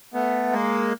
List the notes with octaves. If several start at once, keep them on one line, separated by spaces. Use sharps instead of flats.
A3 B3
G#3 A#3